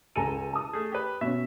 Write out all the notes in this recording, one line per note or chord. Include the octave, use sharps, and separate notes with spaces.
C#2 A4 G#5 A#5 D#7
A5 D#6
A3 G#4
G4 B4
B2 C#4 E5